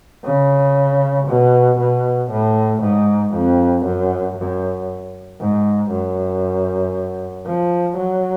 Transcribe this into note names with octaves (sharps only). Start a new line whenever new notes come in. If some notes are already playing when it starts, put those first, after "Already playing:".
C#3
B2
B2
A2
G#2
F2
F#2
F#2
G#2
F#2
F3
F#3